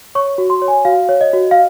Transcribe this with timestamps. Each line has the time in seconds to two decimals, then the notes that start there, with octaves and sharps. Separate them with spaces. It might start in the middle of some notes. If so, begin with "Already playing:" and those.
0.15 C#5 C#6
0.38 F#4
0.50 C6
0.62 C#5
0.68 G#5
0.85 F#4 F5
1.09 C#5
1.21 D#5
1.33 F#4
1.51 F5